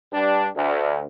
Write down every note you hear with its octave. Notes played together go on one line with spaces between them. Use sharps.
G2 G3 D4
D2